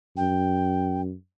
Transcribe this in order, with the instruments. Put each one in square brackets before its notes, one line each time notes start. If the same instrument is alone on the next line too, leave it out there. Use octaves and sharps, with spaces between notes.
[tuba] F#2 [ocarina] G5